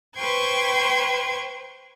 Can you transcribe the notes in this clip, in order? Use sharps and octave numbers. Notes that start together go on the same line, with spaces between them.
B4 C5 G5 C6 C#6 G#6